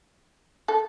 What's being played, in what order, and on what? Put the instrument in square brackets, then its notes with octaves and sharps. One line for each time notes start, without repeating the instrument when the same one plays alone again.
[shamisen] A4